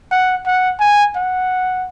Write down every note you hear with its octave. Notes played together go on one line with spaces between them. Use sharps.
F#5
F#5
G#5
F#5